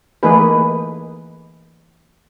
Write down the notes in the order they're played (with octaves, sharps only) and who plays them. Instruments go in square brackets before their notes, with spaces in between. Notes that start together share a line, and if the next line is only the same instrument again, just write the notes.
[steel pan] E3 A3 A#3 D#4 G#4 B4